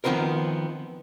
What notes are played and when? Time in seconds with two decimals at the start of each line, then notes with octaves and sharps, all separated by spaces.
0.04 D#3 F3 B3 C4 A#4